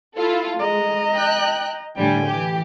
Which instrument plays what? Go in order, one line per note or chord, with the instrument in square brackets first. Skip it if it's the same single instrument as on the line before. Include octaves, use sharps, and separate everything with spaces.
[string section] E4 F4 A4
[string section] G#3 [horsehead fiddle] D#5 A#5
[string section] G5 F#6
[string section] A2 D3 G3 [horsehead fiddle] G5 G#5
[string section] E3 G4